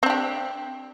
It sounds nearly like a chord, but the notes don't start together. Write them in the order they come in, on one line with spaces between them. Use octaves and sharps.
C4 D4 G4